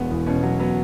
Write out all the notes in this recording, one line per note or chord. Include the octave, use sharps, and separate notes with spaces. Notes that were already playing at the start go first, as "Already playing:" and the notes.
Already playing: E1 B3
E2
B2 C#4
F#3
F#3 B3